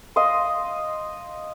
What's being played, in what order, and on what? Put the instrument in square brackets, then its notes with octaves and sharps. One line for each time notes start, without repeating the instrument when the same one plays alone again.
[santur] D#5 F5 C6